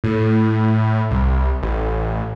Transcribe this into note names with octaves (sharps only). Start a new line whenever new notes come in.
A2
C2
A1